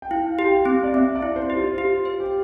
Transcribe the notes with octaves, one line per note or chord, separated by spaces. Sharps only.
G5
E4 F5
G4
G5
F5
C4
D5
C4 E5
D5
E4
C5
G4
F4
F4 G4
C5
G4